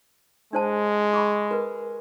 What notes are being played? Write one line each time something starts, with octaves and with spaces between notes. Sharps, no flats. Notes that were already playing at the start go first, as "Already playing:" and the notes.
G#3 D4 C5 A5
B5 C#6 D6
A#4 B4